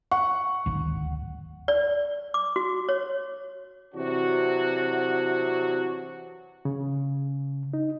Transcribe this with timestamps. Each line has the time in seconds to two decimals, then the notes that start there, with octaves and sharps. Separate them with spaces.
0.12 F#5 C#6
0.66 D1 G#1 D#2
1.68 D5
2.34 D6
2.56 F#4
2.89 C#5
3.94 C3 E3 F#3 D4 F#4
6.65 C#3
7.74 D#4